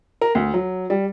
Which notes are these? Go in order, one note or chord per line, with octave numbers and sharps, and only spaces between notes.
A#4
D2
F#3
G3